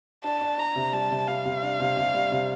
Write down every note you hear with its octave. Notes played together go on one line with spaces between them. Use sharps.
D4 A5
D4
D4 A#5
C3
G3 A5
C3
G3 F5
C3
D4
C3
C3
G3
C3